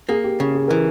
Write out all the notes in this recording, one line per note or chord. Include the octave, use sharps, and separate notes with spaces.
A#3 G#4
G4
C#3
G#4
E3 A#4